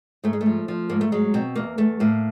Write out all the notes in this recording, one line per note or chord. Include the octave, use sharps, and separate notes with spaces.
G#2 A3
G#3
A3
F3
F3
G#2 A#3
A3
F#3 G#3
B2 C4
E2 A#3
E2 A3
A2 A#3